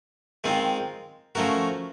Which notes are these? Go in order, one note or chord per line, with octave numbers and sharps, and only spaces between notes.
D#3 G#3 C4 F4
F3 A3 C#4 F#4 A#4